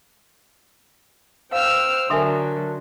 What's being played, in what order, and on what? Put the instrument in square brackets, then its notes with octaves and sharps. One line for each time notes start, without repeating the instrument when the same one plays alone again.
[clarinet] C5 [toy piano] F5 [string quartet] G5 E6 F6
[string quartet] D3 F#3 [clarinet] D4 [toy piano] A4 E5 G#5 [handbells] A#4 C6